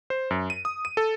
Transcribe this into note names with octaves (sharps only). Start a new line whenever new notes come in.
C5
F#2
D#7
D#6
D#7
A4